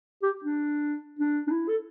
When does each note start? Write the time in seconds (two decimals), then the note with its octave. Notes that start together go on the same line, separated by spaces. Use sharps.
0.22 G4
0.44 D4
1.19 D4
1.47 D4
1.51 E4
1.68 A4